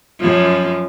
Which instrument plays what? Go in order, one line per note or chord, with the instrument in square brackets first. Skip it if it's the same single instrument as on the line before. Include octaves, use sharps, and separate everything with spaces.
[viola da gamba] F#2 F3